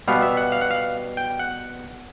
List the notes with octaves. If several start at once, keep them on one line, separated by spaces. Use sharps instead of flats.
B2 G3 B3 F5
E5
F#5
F5
F#5
F5
G5
F#5